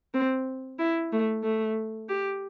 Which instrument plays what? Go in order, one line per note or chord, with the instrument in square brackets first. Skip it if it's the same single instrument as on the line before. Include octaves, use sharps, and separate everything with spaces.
[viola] C4
E4
A3
A3
G4